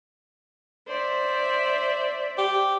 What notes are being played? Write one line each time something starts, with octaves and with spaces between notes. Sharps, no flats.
C5 D5 E5
G4